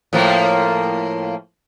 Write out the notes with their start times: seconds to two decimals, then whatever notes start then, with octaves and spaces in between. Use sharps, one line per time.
0.13 A2 F3 A#3